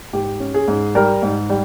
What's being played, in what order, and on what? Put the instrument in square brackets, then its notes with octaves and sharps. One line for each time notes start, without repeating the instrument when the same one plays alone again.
[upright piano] G#2 G4
C#4
G#4
G#2
G3 A#4
G#2
G3